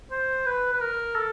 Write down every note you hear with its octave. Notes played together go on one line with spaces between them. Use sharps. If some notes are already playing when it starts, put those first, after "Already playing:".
C5
B4
B4
A#4
A4